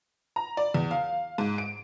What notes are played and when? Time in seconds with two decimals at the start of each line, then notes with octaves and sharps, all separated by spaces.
0.36 A#5
0.57 D5
0.74 E2
0.91 F5
1.38 G#2
1.58 D7